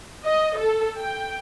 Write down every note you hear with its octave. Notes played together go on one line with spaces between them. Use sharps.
D#5
A4
G5